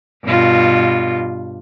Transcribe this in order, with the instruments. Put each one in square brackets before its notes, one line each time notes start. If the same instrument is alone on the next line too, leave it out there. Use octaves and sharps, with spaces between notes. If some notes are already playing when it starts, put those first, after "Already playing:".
[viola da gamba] G2 B2 F4